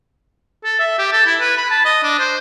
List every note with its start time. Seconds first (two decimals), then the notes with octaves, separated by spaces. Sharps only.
0.65 A4
0.79 E5
0.99 G4
1.13 A4
1.26 E4
1.40 B4
1.57 B5
1.70 A5
1.85 D#5
2.03 D4
2.19 C5